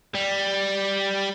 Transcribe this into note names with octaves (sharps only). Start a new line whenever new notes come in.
G3